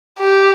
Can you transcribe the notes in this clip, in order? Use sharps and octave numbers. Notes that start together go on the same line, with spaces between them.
G4